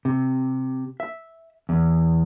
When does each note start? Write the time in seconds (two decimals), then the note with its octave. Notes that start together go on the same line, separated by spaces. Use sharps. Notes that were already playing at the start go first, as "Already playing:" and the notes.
0.05 C3
1.00 E5
1.69 E2